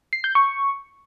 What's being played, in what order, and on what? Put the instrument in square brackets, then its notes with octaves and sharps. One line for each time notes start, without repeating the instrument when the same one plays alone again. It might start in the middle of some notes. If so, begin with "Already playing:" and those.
[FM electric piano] C7
G6
C#6